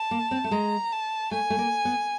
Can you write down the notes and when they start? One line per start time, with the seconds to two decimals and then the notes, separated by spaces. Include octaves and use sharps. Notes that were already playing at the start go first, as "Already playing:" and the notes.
Already playing: A5
0.11 A#3
0.31 C4
0.44 A3
0.51 G#3 A#5
0.92 A5
1.31 A3 G#5
1.50 A3
1.59 A#3
1.85 B3